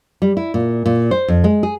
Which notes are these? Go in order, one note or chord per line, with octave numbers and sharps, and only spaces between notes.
G3
E4
A#2
A#2
C5
F2
G#3
G#4